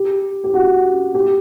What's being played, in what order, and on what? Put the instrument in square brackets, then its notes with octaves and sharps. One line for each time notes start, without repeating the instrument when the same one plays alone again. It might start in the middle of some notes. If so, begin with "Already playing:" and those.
Already playing: [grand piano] G4
G4
F#4
G4